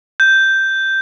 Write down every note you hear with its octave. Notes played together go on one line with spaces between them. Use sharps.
G6